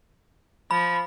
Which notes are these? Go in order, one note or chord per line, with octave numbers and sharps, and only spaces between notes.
F3 B5